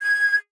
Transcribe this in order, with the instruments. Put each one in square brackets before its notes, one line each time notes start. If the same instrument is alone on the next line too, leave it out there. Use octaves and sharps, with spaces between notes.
[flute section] G#6